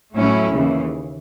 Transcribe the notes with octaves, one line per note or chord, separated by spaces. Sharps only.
A2 F#3 A3 C#4 E4
D#2 C#3 E3